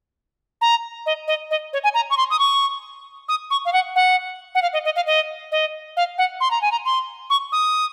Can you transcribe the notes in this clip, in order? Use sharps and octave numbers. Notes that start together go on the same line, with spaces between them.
A#5
D#5
D#5
D#5
C#5
G#5
A#5
C#6
C6
D#6
C#6
D#6
C#6
F5
F#5
F#5
F#5
F5
D#5
D#5
F5
D#5
D#5
F5
F#5
C6
A#5
G#5
A#5
C6
C#6
D#6